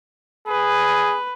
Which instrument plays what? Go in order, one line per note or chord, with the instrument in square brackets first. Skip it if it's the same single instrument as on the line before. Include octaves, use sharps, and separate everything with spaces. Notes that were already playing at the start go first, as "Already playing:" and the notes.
[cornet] G#4 [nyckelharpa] B4